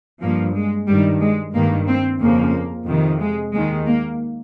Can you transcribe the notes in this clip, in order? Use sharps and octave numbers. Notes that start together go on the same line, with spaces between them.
G2 F3 A#3
G#3
G2 D#3 G3
G#3
G2 D#3 A#3
C4
F2 C#3 F3 A#3
F2 C3 D#3
G#3
D#2 D#3 G#3
A#3